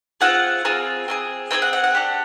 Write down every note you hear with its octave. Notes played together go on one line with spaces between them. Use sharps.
C4 F4 G#4 F#5
C4 F4 G#4
C4 F4 G#4
C4 F4 G#4 G5
F#5
F#5
F#5
D4 G4